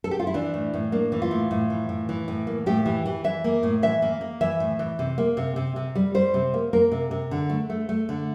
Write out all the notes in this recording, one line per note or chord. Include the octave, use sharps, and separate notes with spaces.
A4
G4
F4
E4
E3 D4
A2
A2
A#3 D4
E3
F4
A2
A2
E3
A2
E3
A2
A#3
A2 G4
E3
E3
E3 E5
A#3
A2
E3 E5
A#3
A#3
E3 E5
A2
E3
C3
A#3
C3
C3
C3
G3
G3 C5
C3
A#3
A#3 A#4
C3
C3
D3
A3
A3
A3
D3